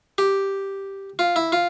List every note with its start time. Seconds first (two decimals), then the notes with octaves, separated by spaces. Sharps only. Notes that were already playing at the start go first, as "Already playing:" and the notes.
0.18 G4
1.19 F4
1.36 E4
1.52 F4